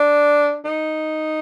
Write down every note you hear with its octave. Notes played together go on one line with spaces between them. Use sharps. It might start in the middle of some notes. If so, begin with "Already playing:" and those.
Already playing: D4
D#4